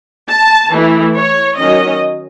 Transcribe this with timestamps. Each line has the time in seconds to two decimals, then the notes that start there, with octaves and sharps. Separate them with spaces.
0.28 A5
0.71 E3 A3 E4
1.14 C#5
1.56 D#3 F#3 C#4 D#5